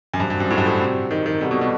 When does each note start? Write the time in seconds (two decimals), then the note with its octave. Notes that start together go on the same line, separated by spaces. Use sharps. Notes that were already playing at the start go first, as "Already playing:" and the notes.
0.14 F#2
0.20 G2 G3 C4 F#4
0.30 G2
0.40 F#2
0.50 A2
0.58 G2
0.66 A2
0.81 C3
1.11 D#3
1.26 D#3
1.41 C3 G3 B3 F#4 A4
1.51 B2
1.61 B2